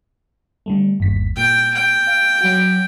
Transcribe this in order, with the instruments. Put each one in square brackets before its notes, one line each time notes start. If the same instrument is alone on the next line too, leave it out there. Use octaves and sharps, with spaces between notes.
[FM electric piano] D3 G3 A3
G1 D#2 B6
[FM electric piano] A#2 [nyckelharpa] G5
[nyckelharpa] G5
[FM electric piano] F5
F#3 F#4